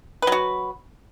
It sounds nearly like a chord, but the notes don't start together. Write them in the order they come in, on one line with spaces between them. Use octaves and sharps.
B4 F#3 F#4